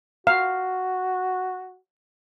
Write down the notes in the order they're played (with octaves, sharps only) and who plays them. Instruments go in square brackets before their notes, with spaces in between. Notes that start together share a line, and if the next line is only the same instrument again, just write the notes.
[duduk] F#4 [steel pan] F5